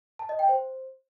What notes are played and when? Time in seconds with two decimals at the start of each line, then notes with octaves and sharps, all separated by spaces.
0.19 A5
0.29 D#5
0.39 G5
0.49 C5